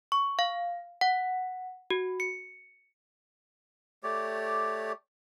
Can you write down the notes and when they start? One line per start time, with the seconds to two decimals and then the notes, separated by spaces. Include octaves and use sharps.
0.12 C#6
0.39 F5
1.01 F#5
1.90 F#4
2.20 C#7
4.03 A3 G4 C#5 D5